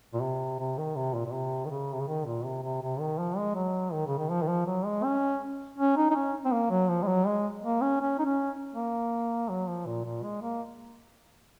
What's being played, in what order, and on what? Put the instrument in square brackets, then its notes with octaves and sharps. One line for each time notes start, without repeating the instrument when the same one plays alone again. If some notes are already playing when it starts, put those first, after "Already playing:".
[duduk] A#2
C3
C3
D#3
C3
A#2
A#2
C3
D#3
C#3
C3
C#3
D#3
A#2
C3
C3
C3
D#3
F3
G#3
F#3
D#3
C#3
D#3
F3
D#3
F3
F#3
G#3
C#4
C#4
D#4
D#4
C#4
C4
A#3
F#3
F3
G#3
F#3
G#3
A#3
C#4
C#4
D#4
C#4
A#3
F#3
F3
A#2
A#2
G#3
A#3